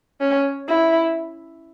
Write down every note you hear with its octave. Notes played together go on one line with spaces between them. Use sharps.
C#4
E4